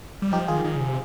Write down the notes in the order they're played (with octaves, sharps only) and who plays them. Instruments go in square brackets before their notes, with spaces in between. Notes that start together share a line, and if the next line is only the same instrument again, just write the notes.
[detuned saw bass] G3
[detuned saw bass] F3 [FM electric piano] D#4 G4
[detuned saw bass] D#3 [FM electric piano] F4 G#4
[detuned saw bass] D#3
C#3
C3